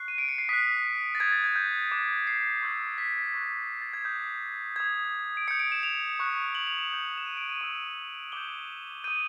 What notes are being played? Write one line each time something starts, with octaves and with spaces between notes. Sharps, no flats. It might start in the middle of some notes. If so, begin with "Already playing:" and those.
Already playing: C#6 F#6 C7
D#7
D7
C#7
C7
D#6 F#6 B6
A6
D#6 G6 G#6
A6
G#6
G6
D6 F#6
C7
C#6 E6 G6
B6
C#6 F#6
A6
G#6
D#6 F#6 G6
D#6 G6 G#6
D7
D#6 G6 C#7
D7
E7
F7
C#6 F#6
F#7
F7
E7
D#6 G6
E7
D#7
D7
D#7
C#6 E6 G6
D6 G6 G7
D#6 G6 D#7